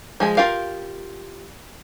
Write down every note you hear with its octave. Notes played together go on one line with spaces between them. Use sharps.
F3 G#3 G#4
F4 G4 A#4 F5